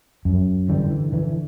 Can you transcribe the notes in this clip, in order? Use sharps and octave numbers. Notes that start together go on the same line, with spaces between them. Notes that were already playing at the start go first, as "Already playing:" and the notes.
F#2
D3 E3 G3
E3
D3 E3